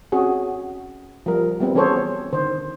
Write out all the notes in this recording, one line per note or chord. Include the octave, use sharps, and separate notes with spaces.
C4 C#4 F#4 G#4
F3 G3 A#4
G3 B3 C4
E3 C#4 G#4 A4 C5 C#5
D3 D#3 C5